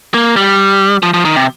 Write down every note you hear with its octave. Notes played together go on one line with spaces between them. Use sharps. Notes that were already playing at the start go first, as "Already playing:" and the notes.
A#3
G3
F3
F3
D#3
C3